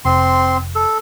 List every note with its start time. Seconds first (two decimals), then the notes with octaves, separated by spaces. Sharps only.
0.05 F1 C4 C6
0.76 A4